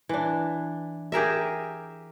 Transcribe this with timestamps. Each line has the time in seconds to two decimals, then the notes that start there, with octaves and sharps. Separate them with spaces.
0.09 E3 D4
1.12 G4 G#4 A#4 E5